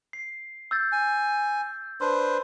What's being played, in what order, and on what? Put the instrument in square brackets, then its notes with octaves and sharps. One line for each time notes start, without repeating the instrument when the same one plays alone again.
[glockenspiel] C7
E6 G6 A6
[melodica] G#5
[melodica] D4 B4 C5 [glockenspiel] C6